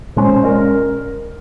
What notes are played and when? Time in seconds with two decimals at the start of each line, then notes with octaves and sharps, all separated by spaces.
0.15 A#2 G#3 C#4 C5
0.43 A#2 G#3 C#4 A#4